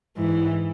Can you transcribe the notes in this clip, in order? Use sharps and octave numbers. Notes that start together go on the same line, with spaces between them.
G#2 E3